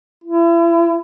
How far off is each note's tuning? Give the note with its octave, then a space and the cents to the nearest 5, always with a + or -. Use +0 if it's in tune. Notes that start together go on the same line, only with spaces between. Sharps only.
E4 +35